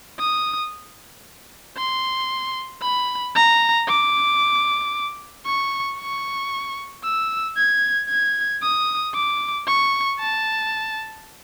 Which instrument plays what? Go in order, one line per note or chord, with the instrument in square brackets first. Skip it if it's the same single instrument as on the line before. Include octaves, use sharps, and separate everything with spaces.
[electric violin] D#6
C6
B5
A#5
D6
C#6
C#6
E6
G#6
G#6
D#6
D6
C#6
A5